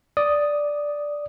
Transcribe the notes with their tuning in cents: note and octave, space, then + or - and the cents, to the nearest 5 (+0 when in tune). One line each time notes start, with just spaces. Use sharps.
D5 +0 D#6 +0